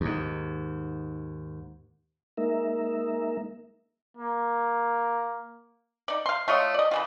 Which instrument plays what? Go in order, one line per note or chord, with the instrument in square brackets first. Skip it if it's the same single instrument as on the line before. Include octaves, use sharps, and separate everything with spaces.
[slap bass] D#2 G#2
[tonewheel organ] G#3 A#3 D#4 A#4 E5
[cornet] A#3
[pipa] D#4 D5
F5 C6
A3 F4 C#5 D#5
D5 D#5
C#3 E3 F4